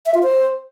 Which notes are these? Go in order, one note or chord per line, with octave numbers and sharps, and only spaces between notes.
E5
F4
C5